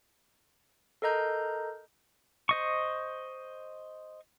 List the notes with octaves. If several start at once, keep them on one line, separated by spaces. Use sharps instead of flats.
A4 A#4 D#5 A#5 G6
C5 D#5 C#6